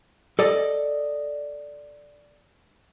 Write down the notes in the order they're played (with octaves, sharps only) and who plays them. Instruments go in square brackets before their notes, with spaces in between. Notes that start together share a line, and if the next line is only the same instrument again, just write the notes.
[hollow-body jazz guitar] A4 D5 D#5